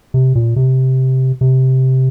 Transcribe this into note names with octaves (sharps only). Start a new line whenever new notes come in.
C3
A#2
C3
C3